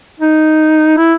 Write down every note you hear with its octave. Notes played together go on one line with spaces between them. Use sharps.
D#4
E4